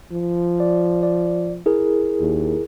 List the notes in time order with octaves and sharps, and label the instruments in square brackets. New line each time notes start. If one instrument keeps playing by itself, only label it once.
[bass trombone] F3
[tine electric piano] D5
D5
E4 G#4 A#4
[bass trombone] D#2